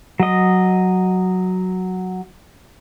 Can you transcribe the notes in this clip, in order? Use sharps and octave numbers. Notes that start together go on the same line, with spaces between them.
F#3 D#5